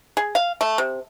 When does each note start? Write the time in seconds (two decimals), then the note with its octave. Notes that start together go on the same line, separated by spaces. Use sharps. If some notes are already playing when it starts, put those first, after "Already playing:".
0.17 G#4
0.35 F5
0.61 A3
0.78 C3